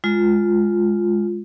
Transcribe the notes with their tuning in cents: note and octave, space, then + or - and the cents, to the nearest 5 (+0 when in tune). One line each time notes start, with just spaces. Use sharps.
G#3 +0 F4 +0